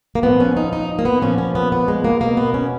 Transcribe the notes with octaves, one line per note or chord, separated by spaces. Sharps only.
A#3
A#2 F3 B3
C#4
D#4
D#4
A#3
B3
A#2 F3 C#4
C#4
B3
B3
G#3
A#3
B2 A#3
B3
C#4